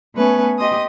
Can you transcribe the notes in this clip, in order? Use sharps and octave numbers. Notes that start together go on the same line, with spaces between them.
A3 B3 C#4 B4 G#5
G4 D#5 C6 D#6